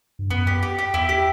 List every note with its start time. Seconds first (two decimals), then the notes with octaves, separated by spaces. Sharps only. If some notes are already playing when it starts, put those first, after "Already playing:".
0.19 G2
0.30 F#2 B3
0.47 G4
0.63 G4
0.79 G4
0.94 E2 E4
1.09 G4